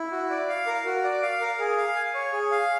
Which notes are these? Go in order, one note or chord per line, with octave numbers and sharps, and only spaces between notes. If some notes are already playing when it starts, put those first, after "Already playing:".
Already playing: E4
F#4
D5
F5
A#4
F#4
D5
F5
A#4
G#4
F5
G#5
C#5
G#4
F5